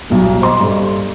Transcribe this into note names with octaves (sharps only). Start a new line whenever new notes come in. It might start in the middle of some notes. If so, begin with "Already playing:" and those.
B1 G2 F#3
C5 D#5 C6
G2 A4